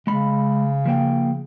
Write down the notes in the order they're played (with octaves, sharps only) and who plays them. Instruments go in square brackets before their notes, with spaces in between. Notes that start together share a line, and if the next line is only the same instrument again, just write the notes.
[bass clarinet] C#3 [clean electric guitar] G#3 B5
[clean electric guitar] F3 A#3 G5